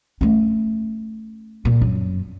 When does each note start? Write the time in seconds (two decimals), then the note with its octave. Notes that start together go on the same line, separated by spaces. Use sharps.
0.21 A3 C#4
1.65 A#2
1.81 F#2